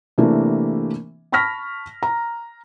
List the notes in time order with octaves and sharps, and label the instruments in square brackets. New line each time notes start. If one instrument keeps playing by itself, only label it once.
[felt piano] C3 E3 A3 A#3 D4
A5 B5 C#6 F6 A#6 B6
A#5